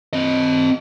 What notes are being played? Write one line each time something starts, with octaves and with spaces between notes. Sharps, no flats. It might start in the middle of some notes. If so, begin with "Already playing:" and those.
C4 D#5